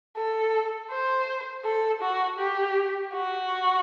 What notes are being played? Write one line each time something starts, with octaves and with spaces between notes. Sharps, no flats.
A4
C5
A4
F#4
G4
F#4